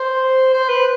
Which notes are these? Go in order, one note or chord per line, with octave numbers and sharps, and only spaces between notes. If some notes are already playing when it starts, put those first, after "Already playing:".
Already playing: C5
C5
B4